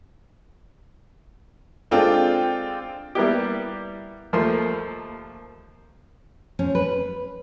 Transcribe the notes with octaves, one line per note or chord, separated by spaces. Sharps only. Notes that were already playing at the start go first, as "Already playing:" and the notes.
G#3 C4 D4 F4 A4 G5
G3 A#3 B3 E4 G4
D#2 F3 A3 A#3 C6
F3 C#4
B4